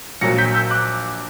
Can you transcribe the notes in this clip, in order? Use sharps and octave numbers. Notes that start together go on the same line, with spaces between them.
A#1 A#2 F#3 A#6 C#7
G6 B6
E6 G6
D6 F#6